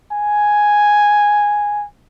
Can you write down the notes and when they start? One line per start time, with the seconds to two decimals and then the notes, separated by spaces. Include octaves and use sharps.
0.12 G#5